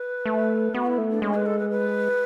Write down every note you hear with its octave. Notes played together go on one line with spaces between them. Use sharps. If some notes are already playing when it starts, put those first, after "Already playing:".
Already playing: B4
A3
B3 F#4
E4
A3
D4
G#3 C#4
B4
A4
B4
B4